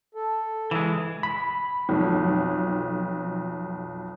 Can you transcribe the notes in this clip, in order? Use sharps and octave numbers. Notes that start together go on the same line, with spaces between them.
A4
E3 G#3
B5
B1 F2